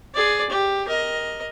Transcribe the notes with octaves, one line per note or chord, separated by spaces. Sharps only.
G#4 D5
G4
A#4 D#5